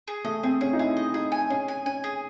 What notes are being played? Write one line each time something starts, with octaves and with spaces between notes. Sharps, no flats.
G#4
A3 D#5
C4 G#4
C#4 G#4
D#4
E4 G#4
D#5
D#4 G#4
G#5
C#4 G#4
G#5
C#4 G#5
G#4